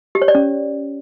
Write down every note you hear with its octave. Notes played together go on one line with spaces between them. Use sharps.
G4
C#5
D5
C#4